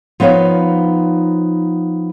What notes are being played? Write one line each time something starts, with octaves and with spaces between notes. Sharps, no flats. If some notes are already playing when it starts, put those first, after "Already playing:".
F3 B3 D#4 C#5 F5